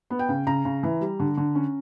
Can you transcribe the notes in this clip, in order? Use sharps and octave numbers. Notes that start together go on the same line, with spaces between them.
B3
G5
C#3
C#3 A#5
C#3
E3
G3
D3
D3
C#4